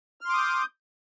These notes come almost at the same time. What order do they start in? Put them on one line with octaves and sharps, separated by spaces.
F6 C6 D6 D#6 G6